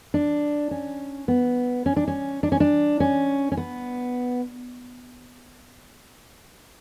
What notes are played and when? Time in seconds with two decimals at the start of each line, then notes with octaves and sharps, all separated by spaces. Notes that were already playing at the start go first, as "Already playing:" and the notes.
0.14 D4
0.71 C#4
1.28 B3
1.86 C#4
1.96 D4
2.08 C#4
2.43 D4
2.52 C#4
2.60 D4
3.00 C#4
3.52 C#4
3.57 B3